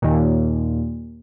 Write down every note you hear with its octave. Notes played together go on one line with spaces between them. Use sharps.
D#2 A#2